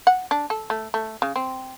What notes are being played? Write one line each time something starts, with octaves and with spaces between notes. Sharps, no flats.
F#5
D4
A4
A3
A3
C#3
C4